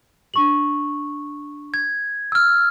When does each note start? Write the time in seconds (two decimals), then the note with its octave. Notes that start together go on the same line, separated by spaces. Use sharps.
0.34 D4 C#6 F#7
1.74 G#6
2.32 E6 F6